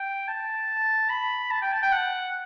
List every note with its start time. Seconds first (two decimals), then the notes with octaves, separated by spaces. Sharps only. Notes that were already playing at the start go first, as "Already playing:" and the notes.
Already playing: G5
0.28 A5
1.10 B5
1.51 A5
1.62 G5
1.73 A5
1.83 G5
1.92 F#5